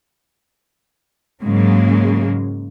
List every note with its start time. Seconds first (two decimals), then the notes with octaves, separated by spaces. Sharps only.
1.43 G#2 C#3 F#3 G#3 A#3